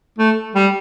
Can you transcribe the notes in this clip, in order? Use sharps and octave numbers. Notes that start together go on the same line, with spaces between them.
A3
G3